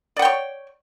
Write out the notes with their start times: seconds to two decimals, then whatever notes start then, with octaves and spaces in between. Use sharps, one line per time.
0.17 D5
0.19 F#5
0.22 G5
0.25 C#5